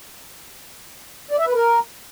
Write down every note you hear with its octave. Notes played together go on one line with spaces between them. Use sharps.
D5
E5
B4
A#4